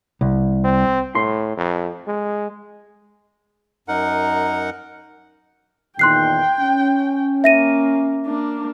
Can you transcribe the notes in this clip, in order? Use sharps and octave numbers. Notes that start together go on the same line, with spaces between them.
C2
C4
A2 C6
F2
G#3
F#2 D#4 A#4 F#5
E2 A#2 D#3 G5 C6 F#6 C7
C#4
A#3 E5 A#6 D#7
A#3 D4